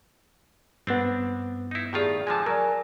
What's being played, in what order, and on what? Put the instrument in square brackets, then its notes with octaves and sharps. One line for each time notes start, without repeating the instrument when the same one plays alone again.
[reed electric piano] G2 B3 [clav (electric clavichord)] C4 D4
[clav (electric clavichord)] D#4 E4
[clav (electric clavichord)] A2 D#3 F4 [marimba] G4 G#4 D5
[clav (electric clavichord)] D3 F3 G#3 [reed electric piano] G#5 A5
[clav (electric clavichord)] F#3 [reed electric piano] A#4 [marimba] D5 G#5